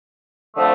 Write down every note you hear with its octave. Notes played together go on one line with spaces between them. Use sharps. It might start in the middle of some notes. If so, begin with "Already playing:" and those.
D3 F3 A3 C4